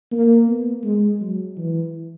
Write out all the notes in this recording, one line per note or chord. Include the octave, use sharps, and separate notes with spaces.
A#3
B3
G#3
F#3
E3